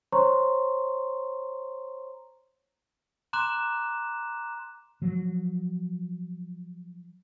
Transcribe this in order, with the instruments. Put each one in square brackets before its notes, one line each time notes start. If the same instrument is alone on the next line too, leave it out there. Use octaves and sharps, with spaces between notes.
[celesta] C5 C#5 A#5 C6 C#6
[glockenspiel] A#5 C6 D6 F#6 E7
[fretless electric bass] F3 F#3